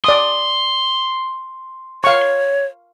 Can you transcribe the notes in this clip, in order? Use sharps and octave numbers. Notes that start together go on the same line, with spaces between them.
D5 C6 D#6
C#5 F5 C#6